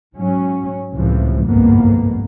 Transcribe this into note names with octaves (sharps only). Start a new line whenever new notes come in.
G#2 F#3 C#4
C#2 A2 C3 E3 F3
G1 C2 F2 G#2 A#3 B3